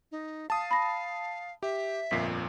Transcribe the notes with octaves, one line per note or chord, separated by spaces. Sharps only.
D#4
F5 A5 D#6
B5 A#6
G4 E5
G1 F2 A#2 B6 C7